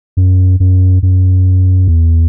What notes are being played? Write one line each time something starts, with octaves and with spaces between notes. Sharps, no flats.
F#2
F#2
F#2
E2